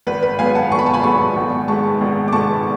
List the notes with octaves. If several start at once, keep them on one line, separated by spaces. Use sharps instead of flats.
G#1 B4
B4
G#2 F#3 B3 F5 G#5
F#5 A5
G#1 C#6
B5
A5
G#5 B5
G#2 F#3 B3 A5 C#6
G#1
G#2 G#3 B3 A5 C#6
G#1
D6
G#2 G#3 B3 A5 C#6